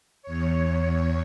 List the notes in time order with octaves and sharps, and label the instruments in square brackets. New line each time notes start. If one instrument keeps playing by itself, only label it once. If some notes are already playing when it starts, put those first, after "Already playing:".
[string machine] E2 C#5